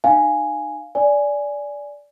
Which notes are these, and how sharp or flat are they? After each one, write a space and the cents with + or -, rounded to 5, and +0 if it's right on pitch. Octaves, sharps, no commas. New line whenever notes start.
D#4 -35 F5 +0 G#5 +0
D5 -15 G#5 +0